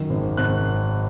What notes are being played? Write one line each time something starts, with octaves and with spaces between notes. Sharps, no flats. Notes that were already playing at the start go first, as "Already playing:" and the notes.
Already playing: F#2 D#3
G#1
G#1 F#6